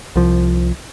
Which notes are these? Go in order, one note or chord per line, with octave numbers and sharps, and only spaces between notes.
C2 F3